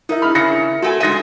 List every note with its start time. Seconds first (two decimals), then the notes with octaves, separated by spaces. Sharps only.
0.09 D#4 E4 A#4 E5
0.22 B5 F6
0.35 C#3 A#6 C#7
0.83 A3 F#4 A4 G#5
1.00 G#3 D#4 E5 A#6 D#7